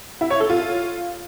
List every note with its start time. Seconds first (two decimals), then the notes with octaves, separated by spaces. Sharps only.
0.21 E4
0.30 C#5
0.40 A4
0.50 F4